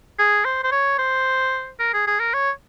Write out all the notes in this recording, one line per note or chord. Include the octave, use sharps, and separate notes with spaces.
G#4
C5
C5
C#5
C5
A#4
G#4
G#4
A#4
C#5